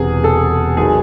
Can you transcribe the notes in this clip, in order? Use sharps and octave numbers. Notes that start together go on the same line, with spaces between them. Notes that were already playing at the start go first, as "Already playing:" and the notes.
Already playing: E1 E2 C3 G#4
A4
G#1 D#3 F#3 G#4